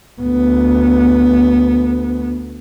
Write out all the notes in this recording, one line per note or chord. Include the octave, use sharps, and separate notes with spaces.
D2 B3